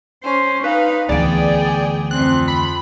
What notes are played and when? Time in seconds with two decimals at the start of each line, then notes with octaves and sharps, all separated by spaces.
0.24 C#4 C5
0.64 D#4 B4 F5
1.09 D2 E3 B3 G#4 D5 G5
2.11 F2 C4 F#6
2.48 B5